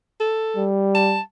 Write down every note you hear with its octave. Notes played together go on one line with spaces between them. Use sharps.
A4
G3
A5